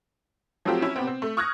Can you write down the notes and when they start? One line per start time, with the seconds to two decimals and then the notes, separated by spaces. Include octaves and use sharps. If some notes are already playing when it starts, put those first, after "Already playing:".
0.65 F3 F#3 A3 C4 F4 G4
0.82 C#4 E4
0.96 C3 B3 C4
1.07 C4
1.22 A3
1.37 C#6 D#6 F6 F#6 G#6 A#6